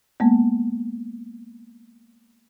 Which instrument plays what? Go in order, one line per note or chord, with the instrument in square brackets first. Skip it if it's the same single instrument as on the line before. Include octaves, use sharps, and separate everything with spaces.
[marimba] G#3 A#3 B3